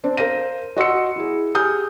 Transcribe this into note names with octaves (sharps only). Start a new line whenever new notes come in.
C4 D4
A#4 C5 F5 A#6 D#7
F#4 D#5 C6 E6 C#7
E4 G#4
G4 G#4 G#5 D#6 F6 G6